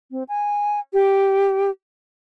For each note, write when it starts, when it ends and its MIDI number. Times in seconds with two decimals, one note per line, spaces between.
0.11 0.23 60
0.29 0.80 80
0.93 1.70 67